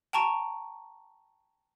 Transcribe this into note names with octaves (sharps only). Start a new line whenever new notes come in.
G5 A5 A#5 C#6 D7